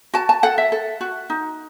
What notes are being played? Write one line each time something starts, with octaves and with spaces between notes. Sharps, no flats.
F#4 A5
A5
A4 F#5
E5
A4
F#4
D#4